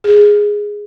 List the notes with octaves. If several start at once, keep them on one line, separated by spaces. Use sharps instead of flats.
G#4